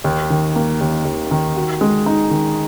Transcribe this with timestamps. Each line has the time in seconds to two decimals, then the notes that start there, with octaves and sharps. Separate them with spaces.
0.04 D#2
0.30 D#3
0.56 A#3
0.81 D#2
1.05 D#2
1.31 D#3
1.56 F#4
1.81 G#3
2.06 D#4
2.30 D#3